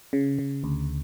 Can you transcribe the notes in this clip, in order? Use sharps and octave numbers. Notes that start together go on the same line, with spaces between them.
C#3
C#3
D2